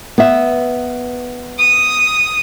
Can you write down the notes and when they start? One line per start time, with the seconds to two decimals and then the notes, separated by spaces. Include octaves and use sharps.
0.18 B3 E5
1.59 D#6